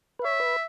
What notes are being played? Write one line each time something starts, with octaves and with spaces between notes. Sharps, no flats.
B4
C#5 E5
B4